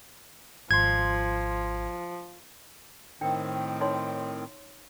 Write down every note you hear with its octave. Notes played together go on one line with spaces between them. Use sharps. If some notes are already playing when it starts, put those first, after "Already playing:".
G#1 F3 C6 G#6
A2 D#3 C4 D4 G5
D#4 C#5 C6